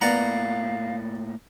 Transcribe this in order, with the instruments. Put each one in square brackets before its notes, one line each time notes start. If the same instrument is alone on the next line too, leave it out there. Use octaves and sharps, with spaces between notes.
[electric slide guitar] A2 A#3 [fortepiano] B3 [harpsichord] D5 F#5 A#5 [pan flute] F5